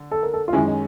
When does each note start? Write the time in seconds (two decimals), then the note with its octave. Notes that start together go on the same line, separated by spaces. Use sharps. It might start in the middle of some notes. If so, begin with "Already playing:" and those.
Already playing: D3
0.11 A4
0.23 A#4
0.34 A4
0.48 F4
0.53 F#2 D#3 G#3 C#4 E4
0.67 D#4